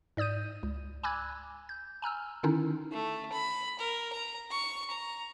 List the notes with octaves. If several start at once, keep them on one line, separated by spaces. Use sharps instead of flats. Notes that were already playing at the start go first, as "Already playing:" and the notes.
G#2 D5 D#6 G6 D#7
C#2
G#5 B5 D6 E6 F#6 G#6
G6
G#5 A#5 E6 F6
D3 D#3 C#4 D#4 E4
A3
B5
A#4
A#5
C#6
A#5